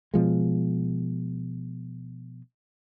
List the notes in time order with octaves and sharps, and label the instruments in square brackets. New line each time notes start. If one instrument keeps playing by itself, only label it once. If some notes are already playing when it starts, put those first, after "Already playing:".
[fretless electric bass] B2 F3 G#3